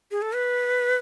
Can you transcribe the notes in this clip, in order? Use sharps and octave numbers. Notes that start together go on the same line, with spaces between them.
G#4
A4
B4